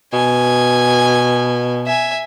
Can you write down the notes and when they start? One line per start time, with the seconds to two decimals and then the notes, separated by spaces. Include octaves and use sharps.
0.13 B2 G#5
1.86 E5 G#5